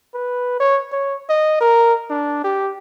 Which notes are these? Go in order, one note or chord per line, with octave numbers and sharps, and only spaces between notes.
B4
C#5
C#5
D#5
A#4
D4
G4